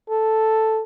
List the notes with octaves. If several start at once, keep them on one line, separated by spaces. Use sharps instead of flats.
A4